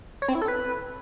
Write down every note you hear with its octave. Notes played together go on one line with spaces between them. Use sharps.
C#5
C4
E4
A4
B4